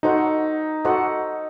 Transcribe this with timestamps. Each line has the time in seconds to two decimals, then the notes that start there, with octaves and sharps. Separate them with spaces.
0.03 D#4 F#4 A4 C5 D#5 F#5
0.85 F#4 A4 C5 D#5 F#5